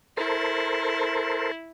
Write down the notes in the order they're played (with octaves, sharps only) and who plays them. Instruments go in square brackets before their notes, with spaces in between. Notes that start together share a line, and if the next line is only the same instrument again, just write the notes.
[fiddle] E4 [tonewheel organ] A4 A#4 C5